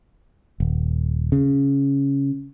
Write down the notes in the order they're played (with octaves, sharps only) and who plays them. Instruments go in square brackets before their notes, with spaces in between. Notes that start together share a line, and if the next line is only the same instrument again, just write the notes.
[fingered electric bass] D#1
C#3